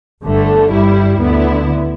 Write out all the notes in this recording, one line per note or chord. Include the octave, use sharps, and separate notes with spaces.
G1 G2 D3 A3
G1 G2 G3 E4
D2 D3 B3 E4